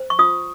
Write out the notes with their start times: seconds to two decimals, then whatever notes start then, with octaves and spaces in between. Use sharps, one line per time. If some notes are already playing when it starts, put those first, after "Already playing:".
Already playing: C5
0.10 C#6
0.19 F4 D#6